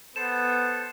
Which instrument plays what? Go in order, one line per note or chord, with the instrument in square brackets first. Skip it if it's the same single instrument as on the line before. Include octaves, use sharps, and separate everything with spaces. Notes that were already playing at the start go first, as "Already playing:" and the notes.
[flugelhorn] B3 [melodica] A4 C5 [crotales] E7